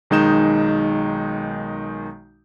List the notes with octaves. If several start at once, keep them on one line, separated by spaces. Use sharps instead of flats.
B1 D#3 G#3 D#4 G6 E7